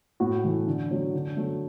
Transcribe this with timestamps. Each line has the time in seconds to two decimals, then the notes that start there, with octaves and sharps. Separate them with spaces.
0.20 A2 F#4
0.44 E3 A3
0.67 D3
0.91 F#3 A3
1.14 D3
1.37 F#3 A3